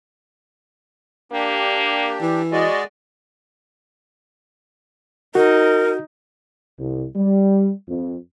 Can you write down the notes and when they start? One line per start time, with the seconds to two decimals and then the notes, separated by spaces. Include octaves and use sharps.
1.32 A#3 D4 G4
2.22 E3
2.52 G#3 F#4 D5 D#5
5.35 D#4 F#4 A#4
6.79 C2
7.15 G3
7.88 F2